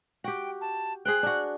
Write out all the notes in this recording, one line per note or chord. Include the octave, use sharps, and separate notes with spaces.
F#4 G4 G5
A5
G#4 C5 G5 F#6
D4 F#4